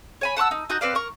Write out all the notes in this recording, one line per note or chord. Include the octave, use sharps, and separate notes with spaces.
C#5 G#5 B5
F#5 A5 C#6 E6
D#4
D#4 F#4 D#5 G6
C4 B4 D5 F5
A#4 C#6